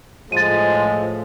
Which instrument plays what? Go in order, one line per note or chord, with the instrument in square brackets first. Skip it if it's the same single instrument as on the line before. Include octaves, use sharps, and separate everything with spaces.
[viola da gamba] A2 [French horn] F3 [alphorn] G#3 [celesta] A6 D#7